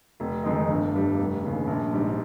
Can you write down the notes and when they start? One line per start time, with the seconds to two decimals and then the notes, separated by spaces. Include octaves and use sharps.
0.20 F1
0.44 F2 D#3 G#3 D#4
0.68 G1
0.93 G2 G3
1.19 F1
1.42 D#2 C#3
1.67 A#1
1.92 G#2 G3